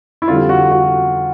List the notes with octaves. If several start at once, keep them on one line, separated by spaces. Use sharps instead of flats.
E4
F2 D3 G3 F4
F#4
F#4